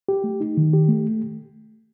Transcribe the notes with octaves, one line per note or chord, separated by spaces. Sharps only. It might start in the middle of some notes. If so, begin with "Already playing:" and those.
G4
A3
D#4
D#3
G4
A3